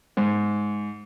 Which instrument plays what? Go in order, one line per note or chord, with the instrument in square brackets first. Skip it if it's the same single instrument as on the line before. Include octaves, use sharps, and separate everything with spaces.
[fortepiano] G#2